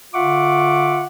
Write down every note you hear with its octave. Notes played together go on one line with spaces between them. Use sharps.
D3 F4 E5 F#5 C#6 D6